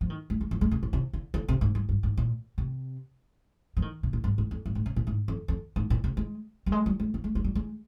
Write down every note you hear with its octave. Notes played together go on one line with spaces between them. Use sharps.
F3
D#3
G#3
G#3
F3
G#3
C3
A#2
C3
D3
D3
C3
G#2
G2
G2
G#2
A#2
C3
F3
D#3
C3
A#2
G2
G#2
F2
G2
G#2
C3
A#2
G#2
F2
F2
G#2
A#2
C3
G#3
G3
G#3
G3
G#3
A#3
G#3
G#3
G3
G#3